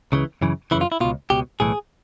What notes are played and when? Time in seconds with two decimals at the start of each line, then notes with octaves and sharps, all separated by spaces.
0.12 C#2 C#3 E3
0.42 F#2 C#3 E3
0.71 F#2 C#3 E3 E4
0.81 F4
0.92 E4
1.01 C#2 B2 F4
1.30 C#2 B2 G4
1.60 B1 A2 E3 G#4